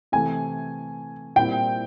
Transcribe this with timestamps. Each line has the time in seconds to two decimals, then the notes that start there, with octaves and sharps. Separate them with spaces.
0.12 C3 E3 A3 G#5
1.36 A#2 G3 C4 E4 G5